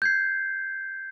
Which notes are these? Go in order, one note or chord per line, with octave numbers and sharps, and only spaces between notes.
G6 G#6 C7